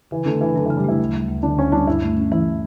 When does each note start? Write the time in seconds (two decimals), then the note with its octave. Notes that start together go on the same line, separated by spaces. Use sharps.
0.11 C#3 E3
0.26 D3 A3
0.41 C#3 E3
0.56 D3 F#3
0.66 C#3 E3
0.77 G3
0.85 A3 E4
1.00 D2
1.14 G3
1.28 D2
1.43 D3 D4
1.58 D2 C#4
1.72 G3 D4
1.87 G2 E4
2.02 A3
2.17 C#4
2.32 E3 E4